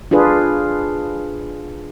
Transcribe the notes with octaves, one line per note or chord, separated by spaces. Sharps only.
D4 F4 G#4 B4